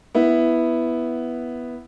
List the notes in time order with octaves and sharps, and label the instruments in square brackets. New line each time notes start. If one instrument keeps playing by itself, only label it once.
[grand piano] B3 E4